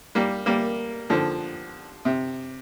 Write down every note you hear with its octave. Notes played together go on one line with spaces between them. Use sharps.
G3 A#3
G3 A#3
D3 F3
C3